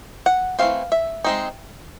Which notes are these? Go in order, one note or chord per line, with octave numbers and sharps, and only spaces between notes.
F#5
E3 A3 C4 F5
E5
G#3 C4 D#4